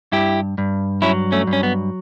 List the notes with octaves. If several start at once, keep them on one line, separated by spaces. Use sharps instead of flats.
G2 E4 G4
G2
F#3 C#4 E4
A3 C#4
G2
C#4
B3